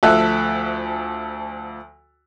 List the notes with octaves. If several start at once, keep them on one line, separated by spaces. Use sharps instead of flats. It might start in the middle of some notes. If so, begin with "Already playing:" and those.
D2 F3 A4 E5 F#6